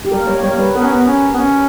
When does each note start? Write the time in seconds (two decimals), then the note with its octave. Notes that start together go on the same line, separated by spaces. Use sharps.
0.05 G4
0.11 G3 A#4
0.19 A#3
0.27 G3 C#5
0.34 A#3
0.42 G3 C#5
0.50 A#3
0.57 G3 B4
0.75 B3 A#4
0.83 C#4
0.91 B3
1.07 C#4
1.34 B3
1.38 C#4